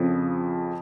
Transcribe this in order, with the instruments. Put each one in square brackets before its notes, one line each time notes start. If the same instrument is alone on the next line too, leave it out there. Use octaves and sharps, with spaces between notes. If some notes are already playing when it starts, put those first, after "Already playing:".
Already playing: [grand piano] F2 C#3 F3